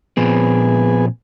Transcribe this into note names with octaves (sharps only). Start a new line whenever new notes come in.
A#2 F3 B3 C4 G#4